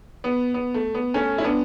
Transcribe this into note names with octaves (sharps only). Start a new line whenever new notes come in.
B3
B3
A3
B3
A3 C#4
E4
B3 D4